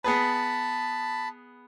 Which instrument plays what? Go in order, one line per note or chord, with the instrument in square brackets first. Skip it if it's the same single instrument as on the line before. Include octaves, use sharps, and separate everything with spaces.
[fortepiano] B3 G#4 B4 [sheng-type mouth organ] A5 B5